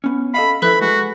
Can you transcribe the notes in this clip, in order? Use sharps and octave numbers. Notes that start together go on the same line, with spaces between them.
B3 C#4
A4 D#5 F5 B5
F3 E4 A4 B4 C5 B5 F#6
G#3 F#4